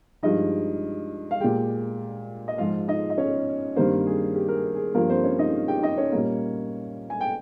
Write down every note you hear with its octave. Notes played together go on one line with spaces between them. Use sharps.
G2 F3 G#3 D#4 D#5
F5
A#2 G#3 G4 G5
D#5
G#2 F3 G#3 F4 F5
D#4 D#5
D#5
C#4 C#5
G2 D#3 G3 A#3 C4 C5
G#4
G4
A#4
G#4
G#4
G2 F3 A#3 A#4
C4 C5
C#4 C#5
D#4 D#5
G4 G5
D#4 D#5
C#4 C#5
A#2 G3 A#3
G#5
G5